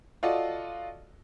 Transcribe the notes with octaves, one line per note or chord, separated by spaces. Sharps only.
F4 F#4 A4 D5 D#5